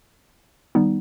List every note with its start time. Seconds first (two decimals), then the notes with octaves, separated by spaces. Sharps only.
0.75 D#3 G3 B3 D#4